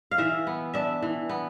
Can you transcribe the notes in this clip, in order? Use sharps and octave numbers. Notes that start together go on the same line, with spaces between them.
F5
E3 E5
B3
D4 E5
E3
B3